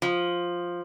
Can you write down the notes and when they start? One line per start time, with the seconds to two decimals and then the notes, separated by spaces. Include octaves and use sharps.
0.02 F3